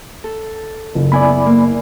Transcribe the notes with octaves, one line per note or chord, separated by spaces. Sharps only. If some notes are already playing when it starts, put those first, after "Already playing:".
A4
F#1
B3 E4 D5 G#5 B5
A#3